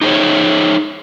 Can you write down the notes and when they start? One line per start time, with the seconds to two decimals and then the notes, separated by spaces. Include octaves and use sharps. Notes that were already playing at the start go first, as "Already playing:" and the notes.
0.01 D#4 G#4 C5 C#5